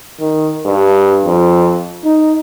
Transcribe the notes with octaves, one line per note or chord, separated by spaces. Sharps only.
D#3
G2
F2
D#4